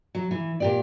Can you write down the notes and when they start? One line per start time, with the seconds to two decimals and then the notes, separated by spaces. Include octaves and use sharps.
0.15 F#3
0.31 E3
0.60 A#2 G4 D5